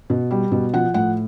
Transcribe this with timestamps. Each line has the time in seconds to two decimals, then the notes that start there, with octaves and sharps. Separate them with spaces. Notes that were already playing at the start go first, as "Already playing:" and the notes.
0.10 B2
0.31 G3
0.52 B2
0.73 F3 F#5
0.94 A2 F#5